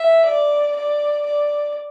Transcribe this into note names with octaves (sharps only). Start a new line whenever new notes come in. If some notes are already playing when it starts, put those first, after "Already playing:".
Already playing: E5
D5
D5
D5